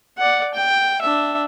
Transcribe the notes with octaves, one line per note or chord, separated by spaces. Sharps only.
D5 F#5
G5
D4 E5